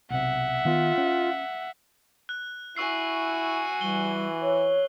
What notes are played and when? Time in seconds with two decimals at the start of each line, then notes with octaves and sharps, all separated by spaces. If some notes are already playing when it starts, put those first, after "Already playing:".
0.10 B1 C3 E5 F#5
0.65 D#3 B3 F4
0.98 C#4
2.29 F#6
2.76 E4 F#4 G#5 C#6 E6 C7
3.81 E3 G3 G7
4.42 C#5